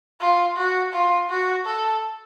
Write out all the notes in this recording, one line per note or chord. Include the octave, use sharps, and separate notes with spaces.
F4
F#4
F4
F#4
A4